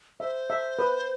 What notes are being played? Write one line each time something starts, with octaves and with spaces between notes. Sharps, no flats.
C5 E5
E5
B4